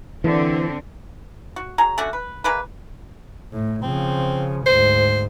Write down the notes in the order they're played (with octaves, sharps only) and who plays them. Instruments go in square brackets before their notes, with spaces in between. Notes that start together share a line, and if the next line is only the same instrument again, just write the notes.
[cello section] D3 C4 [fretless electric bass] E3
[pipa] F#4
F#3 G#4 A#5
A3 C#4 D4 F#4
B4
G#3 A#3 B4
[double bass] A2
[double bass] C#3 F3 [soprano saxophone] C4
[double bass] D2 G#2 [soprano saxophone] C5